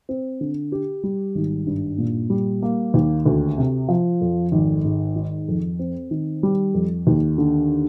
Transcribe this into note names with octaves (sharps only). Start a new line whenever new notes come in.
C4
D3
G4
G3
G#1
G2
A#2
G3
A#3
D#2
D2
C3
F3
F2
G#1
G#2
D#3
F2
C4
D#3
G3
F2
D#2
D3